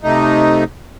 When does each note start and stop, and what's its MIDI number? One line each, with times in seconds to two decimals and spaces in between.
0.03 0.64 48
0.03 0.64 57
0.03 0.64 63